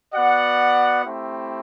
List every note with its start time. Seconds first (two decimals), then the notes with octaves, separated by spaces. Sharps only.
0.14 B3 F#4 D5 F#5
1.04 A3 C4 E4 G4